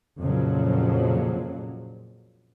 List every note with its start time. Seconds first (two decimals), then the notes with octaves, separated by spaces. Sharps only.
0.20 F2 A#2 C#3 F3 F#3